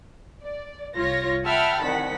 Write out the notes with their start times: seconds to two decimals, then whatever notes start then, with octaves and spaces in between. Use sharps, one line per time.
0.41 D5
0.96 C2 F4 C#5 A#6
1.45 E5 F#5 G5 A5 B5 F6
1.83 C2 D#3 F#5 B6